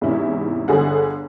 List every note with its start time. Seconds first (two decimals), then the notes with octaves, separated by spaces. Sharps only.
0.01 E2 G#2 C3 C#4 E4
0.68 G1 D3 G#4 F#5